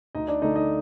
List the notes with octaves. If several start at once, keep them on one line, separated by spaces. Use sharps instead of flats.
D2 D#4 D#5
D4 D5
D3 A3 D#4 D#5
D#4 D#5